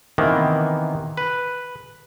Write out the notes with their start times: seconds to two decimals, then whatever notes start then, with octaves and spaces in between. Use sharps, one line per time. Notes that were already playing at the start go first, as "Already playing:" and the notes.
0.18 C3 D#3 E3 A#3 B3
1.17 B4